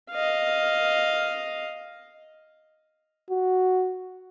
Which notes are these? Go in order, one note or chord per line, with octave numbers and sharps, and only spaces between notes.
D#5 F5
F#4